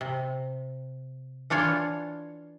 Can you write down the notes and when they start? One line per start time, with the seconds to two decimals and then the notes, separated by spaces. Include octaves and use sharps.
0.01 C3
1.50 E3 D4 F4 C#5